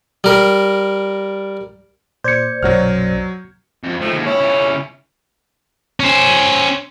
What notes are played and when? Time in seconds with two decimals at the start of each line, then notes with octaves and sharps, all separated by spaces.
0.24 G3 A#4
2.24 A#2 C5 D5 G6 G#6 C#7
2.63 B1 F#2 F#3 F#4 F6
3.84 F2
4.01 F3 A3 D#4
4.13 D#2 G#3
4.26 C#4 E4
4.41 C#3 E4
6.00 C#4 C5